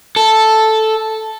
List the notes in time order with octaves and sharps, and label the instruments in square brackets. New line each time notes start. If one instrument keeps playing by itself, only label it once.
[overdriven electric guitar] A4